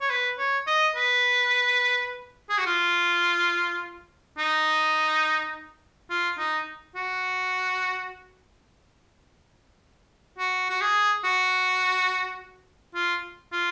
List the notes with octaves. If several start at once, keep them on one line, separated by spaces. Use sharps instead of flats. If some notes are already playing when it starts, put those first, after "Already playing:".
C#5
B4
C#5
D#5
B4
G#4
F#4
F4
D#4
F4
D#4
F#4
F#4
F#4
G#4
F#4
F4
F4